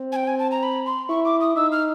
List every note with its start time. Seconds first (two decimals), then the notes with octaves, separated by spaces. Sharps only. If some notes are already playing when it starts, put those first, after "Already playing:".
Already playing: C4
0.12 G#5
0.16 G5
0.27 G#5
0.39 A5
0.51 A#5
0.63 B5
0.86 C6
1.09 E4 C#6
1.25 D6
1.41 D#6
1.56 D#4 E6
1.72 F6